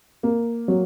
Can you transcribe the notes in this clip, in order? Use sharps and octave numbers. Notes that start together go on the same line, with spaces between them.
A#3
F#3